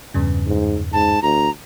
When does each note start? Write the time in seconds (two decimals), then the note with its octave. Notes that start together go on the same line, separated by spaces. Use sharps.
0.14 E2 G2 C#3
0.47 G#2
0.93 G#2 A5
1.23 D2 A#5